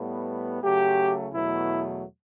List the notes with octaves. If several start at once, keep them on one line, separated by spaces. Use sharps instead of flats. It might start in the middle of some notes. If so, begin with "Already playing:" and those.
Already playing: A2 G3 B3
C#3 F#3 A3 G4
E2 B2 F#3 A3 E4